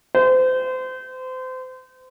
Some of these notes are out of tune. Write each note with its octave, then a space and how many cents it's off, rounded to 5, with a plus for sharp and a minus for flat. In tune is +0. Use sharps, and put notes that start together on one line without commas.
C5 -30